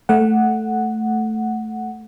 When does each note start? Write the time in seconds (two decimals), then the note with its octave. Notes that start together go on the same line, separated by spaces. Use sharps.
0.09 A3 F#5